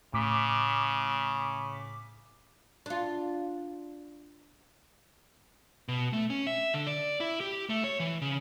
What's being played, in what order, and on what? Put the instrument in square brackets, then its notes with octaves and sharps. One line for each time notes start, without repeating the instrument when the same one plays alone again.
[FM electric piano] A2 D6 B6 [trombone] C#3
[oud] D4 F4
[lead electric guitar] B2
A3
C#4
E5
D3
D5
E4
G4
A3
C#5
E3
C#3